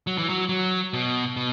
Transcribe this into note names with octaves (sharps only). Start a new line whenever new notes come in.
F#3
E3
F#3
F#3
B2
B2